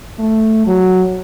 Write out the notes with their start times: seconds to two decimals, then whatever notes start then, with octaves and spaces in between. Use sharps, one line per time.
0.19 A3
0.66 F#3